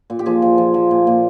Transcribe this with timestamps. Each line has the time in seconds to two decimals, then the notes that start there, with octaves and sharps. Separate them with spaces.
0.10 A#2
0.19 G4
0.26 F3 G#4
0.42 F3
0.58 F3
0.74 F3
0.91 A#2
1.07 A#2